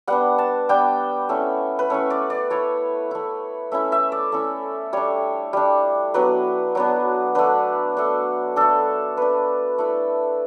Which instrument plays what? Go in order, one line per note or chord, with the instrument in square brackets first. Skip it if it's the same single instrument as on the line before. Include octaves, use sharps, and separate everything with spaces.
[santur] G3 B3 D4 F#5
A5
G3 B3 D4 G5
A3 C#4 E4
B4
A3 C#4 E4 C#5
D5
D5
A3 E4 C#5
A3 E4
A3 C#4 E4 E5
E5
D5
A3 C#4 E4
G3 D4 C#5
G3 D4
F#3 B3 D4 B4
F#3 B3 D4
A3 D4 B4
A3 D4
A3 D4 A4
A3 D4 B4
A3 E4